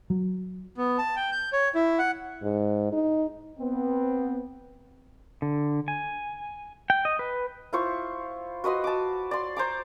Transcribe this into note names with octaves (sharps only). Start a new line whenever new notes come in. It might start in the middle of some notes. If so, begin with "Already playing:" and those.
F#3
B3
A5
G5
G6
C#5
E4
F#5
G#2
D#4
B3 C4
D3
G#5
G5
D#5
B4
E4 F4 C5 C#6
F#4 B4 D#5 C6
A5 D6
D5 C6
C5 A#5 D6